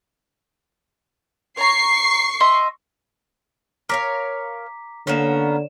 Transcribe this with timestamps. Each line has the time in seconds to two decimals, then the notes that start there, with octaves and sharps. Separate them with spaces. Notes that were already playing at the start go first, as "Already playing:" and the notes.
1.57 C#5 A#5 C#6 C7
2.40 D#5 E5 C6
3.89 A#4 C#5 F5 A#5 D6 B6
5.07 D3 A#3 B3 C#4 C#5 D5 E7